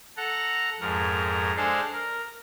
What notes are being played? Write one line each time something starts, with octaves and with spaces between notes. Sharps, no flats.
A4 F#5 A#5
F2 G#2 A#4
G#3 D4 G#4 A4 C5 F5
A#4